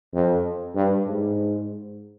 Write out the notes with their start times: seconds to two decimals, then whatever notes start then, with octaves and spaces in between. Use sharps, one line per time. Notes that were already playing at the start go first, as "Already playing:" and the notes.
0.14 F2
0.75 G2
1.07 G#2